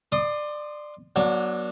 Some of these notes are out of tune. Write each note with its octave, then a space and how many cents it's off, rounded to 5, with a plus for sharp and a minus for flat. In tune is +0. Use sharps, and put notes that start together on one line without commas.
D5 +20 C6 +0 D#6 -15
F#3 +0 B3 -45 D4 +0